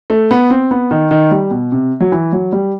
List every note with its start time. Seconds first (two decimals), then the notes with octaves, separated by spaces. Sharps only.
0.10 A3
0.31 B3
0.50 C4
0.71 B3
0.91 D#3
1.11 D#3
1.31 G3
1.51 B2
1.72 C3
2.00 F#3
2.12 E3
2.33 F#3
2.52 G3